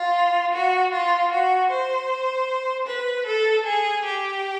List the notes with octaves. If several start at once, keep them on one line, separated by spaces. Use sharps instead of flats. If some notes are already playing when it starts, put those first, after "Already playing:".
Already playing: F4
F#4
F4
F#4
C5
B4
A4
G#4
G4